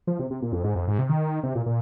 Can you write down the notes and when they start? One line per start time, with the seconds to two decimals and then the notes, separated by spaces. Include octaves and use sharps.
0.07 F3
0.19 C3
0.30 C3
0.42 A#2
0.53 F2
0.64 G#2
0.75 F2
0.88 G#2
0.99 C3
1.09 D#3
1.43 C3
1.55 A#2
1.66 A#2